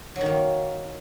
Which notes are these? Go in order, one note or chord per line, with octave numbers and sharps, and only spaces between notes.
F#3
D#3
A#3